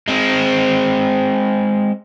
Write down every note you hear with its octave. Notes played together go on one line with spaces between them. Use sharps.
G#3 C4